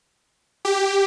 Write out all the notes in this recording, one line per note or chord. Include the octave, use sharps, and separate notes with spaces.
G4